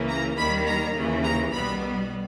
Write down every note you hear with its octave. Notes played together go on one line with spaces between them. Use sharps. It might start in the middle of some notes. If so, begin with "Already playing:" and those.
Already playing: C#2 C#3 E3 A#3
A#5
D#2 D#3 G3 A#3 B5
A#5
D#2 C#3 E3 A#3
A#5
B1 B2 G3 B3 B5